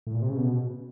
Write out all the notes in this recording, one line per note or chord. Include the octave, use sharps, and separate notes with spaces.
A2
A#2
C3
C#3
B2